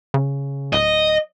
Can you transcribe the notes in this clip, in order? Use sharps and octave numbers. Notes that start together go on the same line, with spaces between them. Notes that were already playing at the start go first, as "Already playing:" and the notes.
C#3
D1 D#5